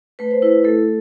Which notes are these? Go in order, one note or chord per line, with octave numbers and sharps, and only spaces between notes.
A3 B4
C5
E4 B4
A3 A4